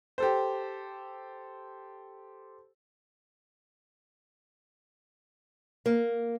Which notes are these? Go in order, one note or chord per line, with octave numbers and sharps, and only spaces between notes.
G4 A4 C5
A#3